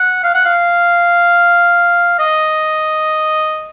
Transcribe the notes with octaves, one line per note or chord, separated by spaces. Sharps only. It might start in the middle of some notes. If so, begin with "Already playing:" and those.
Already playing: F#5
F5
F#5
F5
D#5